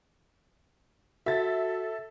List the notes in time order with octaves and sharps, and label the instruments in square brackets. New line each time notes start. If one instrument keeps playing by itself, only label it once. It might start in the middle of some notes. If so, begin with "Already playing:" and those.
[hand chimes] F#4 [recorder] A4 [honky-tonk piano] E5 A6